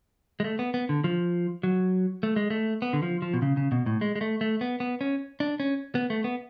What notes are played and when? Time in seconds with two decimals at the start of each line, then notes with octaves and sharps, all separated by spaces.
0.40 G#3
0.44 A3
0.59 B3
0.74 B3
0.89 D3
1.04 F3
1.63 F#3
2.23 A3
2.36 G#3
2.50 A3
2.82 B3
2.93 D3
3.02 F3
3.22 F3
3.34 B2
3.42 C#3
3.57 C#3
3.72 B2
3.86 A2
4.01 G#3
4.16 G#3
4.21 A3
4.41 A3
4.61 B3
4.80 B3
5.01 C#4
5.40 D4
5.60 C#4
5.95 B3
6.10 A3
6.24 B3